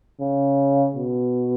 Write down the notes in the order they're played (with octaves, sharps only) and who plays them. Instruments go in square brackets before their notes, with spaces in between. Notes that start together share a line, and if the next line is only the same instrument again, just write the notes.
[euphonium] C#3
B2